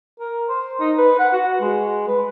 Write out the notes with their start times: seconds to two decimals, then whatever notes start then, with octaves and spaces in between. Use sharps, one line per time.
0.20 A#4
0.49 C5
0.80 D#4
0.98 B4
1.19 F#5
1.33 F#4
1.61 G#3
2.07 B4